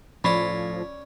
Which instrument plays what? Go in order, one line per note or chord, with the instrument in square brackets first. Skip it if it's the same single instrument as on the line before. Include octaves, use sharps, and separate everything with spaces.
[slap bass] A2 [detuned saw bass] F3 [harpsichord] C#4 D5 [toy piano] B5